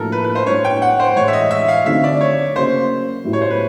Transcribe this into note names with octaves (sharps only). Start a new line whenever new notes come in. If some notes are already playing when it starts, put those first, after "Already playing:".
Already playing: A2 F3 A#3 D4 F#4 A4 A#4
B4
B4
C5
A2 F#3 B3 D4 F#4 C#5
G5
F#5
C5
A2 E3 G#3 C#5
E5
D#5
E5
F5
D3 F#3 A3 C4 D#4 E5
D5
C#5
C#3 F#3 A#3 C5
A2 F#3 B3 E4 G4
C#5
C5
B4